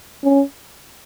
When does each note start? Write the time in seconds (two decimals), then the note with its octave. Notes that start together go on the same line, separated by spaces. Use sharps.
0.24 C#4